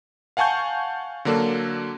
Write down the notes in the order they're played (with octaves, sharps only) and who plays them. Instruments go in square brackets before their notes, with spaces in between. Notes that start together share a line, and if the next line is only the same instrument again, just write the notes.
[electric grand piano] F5 F#5 G#5 A5 C#6 G6
D3 F#3 A#3 D4 A4